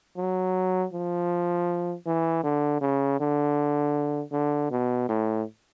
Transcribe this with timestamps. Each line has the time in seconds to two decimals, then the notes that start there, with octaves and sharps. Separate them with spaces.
0.17 F#3
0.93 F3
2.06 E3
2.43 D3
2.81 C#3
3.20 D3
4.32 D3
4.71 B2
5.09 A2